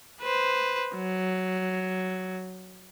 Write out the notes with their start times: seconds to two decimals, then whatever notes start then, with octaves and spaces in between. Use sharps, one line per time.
0.21 B4 C5
0.96 F#3